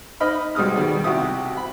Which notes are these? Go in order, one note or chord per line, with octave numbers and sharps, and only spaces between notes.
D#4 D#5 B5 F6
B1 G3 G#3 D#6 F6
B2 D#3 G3
C2 F#4 G4 E5 D#6
B5